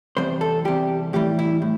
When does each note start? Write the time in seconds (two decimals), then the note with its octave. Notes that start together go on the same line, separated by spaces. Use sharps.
0.17 E2 C3 G3 C5
0.41 A4
0.65 E2 C3 G3 G4
1.13 A2 E3 G3 G4
1.39 E4
1.62 A2